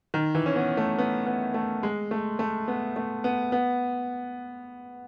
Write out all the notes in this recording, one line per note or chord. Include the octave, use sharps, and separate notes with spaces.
D#3
E3
C#4
B3
A3
B3
B3
A3
G#3
A3
A3
B3
A3
B3
B3